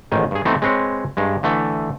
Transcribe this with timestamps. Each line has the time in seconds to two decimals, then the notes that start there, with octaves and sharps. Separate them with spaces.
0.12 A1 G#2 D#3 G#5
0.31 G2 G#4
0.45 E3 A3 B3 C4 D#4
0.62 G#3 C4 B4 C#5
1.17 G2 G#3
1.43 D3 E3 A3